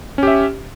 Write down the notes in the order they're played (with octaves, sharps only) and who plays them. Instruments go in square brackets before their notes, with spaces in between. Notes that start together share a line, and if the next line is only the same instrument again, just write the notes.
[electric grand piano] C#4
G4
E5